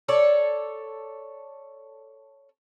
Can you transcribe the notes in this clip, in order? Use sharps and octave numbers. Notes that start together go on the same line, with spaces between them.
A4 C#5 D5